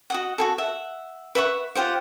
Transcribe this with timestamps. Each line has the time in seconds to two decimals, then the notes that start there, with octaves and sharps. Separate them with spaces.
0.10 F#4 D#5 F#5
0.38 F#4 G#4 A4
0.58 E5 F#5
1.35 B4 E5 F#5 C#6
1.75 F4 G4 C5 F#5